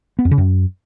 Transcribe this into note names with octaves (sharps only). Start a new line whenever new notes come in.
B3
F2
C#3
F#2